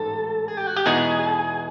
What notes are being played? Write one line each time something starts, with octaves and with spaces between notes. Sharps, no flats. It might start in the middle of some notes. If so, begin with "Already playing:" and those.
Already playing: A1 G#2 A4
G#4
G4
F#4
G4
E2 B2 G#3 B3 D#4 G#4